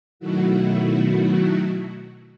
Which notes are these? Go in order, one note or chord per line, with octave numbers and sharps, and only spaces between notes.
B2 D#3 F#3 A3 E4 F#4